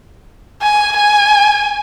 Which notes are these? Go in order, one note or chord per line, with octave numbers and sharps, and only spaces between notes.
G#5
G#5